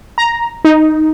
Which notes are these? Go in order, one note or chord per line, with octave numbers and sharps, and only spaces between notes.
A#5
D#4